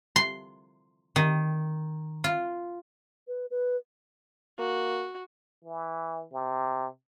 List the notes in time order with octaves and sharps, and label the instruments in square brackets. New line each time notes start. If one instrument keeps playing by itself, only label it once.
[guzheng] C6
D#3
F4
[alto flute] B4
B4
[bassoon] A#3 [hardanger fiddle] F#4
[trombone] E3
C3